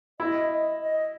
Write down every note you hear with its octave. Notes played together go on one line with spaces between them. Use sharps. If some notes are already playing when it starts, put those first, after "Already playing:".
E4 D#5
D#5
D#5